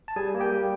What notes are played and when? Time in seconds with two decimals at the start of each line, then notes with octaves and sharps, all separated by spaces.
0.08 A5
0.16 G3 G#4 G#5
0.35 A#3
0.40 G4 G5
0.52 G3